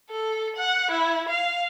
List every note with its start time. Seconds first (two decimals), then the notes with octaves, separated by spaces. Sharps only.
0.11 A4
0.56 F#5
0.91 E4
1.29 F5